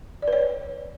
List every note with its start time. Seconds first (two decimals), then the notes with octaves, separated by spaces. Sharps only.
0.22 D5
0.28 B4
0.33 C#5